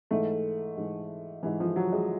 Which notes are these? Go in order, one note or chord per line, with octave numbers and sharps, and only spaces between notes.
G#2 E3 A3
G#2 E3
G#2 E3
F3
F#3
G#3